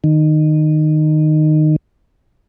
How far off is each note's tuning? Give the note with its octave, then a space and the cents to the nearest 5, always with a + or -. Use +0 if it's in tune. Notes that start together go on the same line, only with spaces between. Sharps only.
D#3 -15